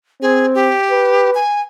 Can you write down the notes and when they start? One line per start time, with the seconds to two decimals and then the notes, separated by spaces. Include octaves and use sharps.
0.22 C4 G#4
0.55 G4
0.90 B4
1.35 G#5